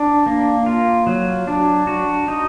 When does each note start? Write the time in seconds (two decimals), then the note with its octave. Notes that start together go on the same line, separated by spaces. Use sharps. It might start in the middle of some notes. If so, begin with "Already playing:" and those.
Already playing: D4
0.26 A#3
0.66 F4
1.07 F#3
1.47 D4
1.87 F#4
2.28 D#4